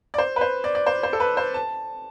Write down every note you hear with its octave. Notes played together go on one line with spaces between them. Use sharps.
D5
C5
B4
C5
D5
D5
C5
C5
A4
B4
C5
A5